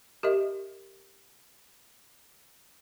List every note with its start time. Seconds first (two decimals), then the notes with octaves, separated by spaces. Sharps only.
0.23 G4 A#4 D#5 E5